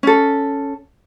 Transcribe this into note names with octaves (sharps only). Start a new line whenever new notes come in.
C#4 A4